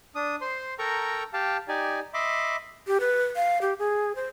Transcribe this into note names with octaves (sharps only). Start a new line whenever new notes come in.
D4 D#6
C5 C6
A4 A#4 G5 A#5 C#6
G4 F5 G5 A5
D#4 G4 D5 G#5
D#5 E5 B5 C6 D6
G4
B4
F5
G4
G#4
C5